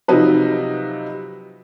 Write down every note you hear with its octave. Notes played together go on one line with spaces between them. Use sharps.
C3 F3 F#3 D#4 B4